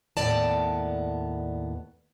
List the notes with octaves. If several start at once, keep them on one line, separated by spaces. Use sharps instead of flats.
D#2 A2 B3 D5 A5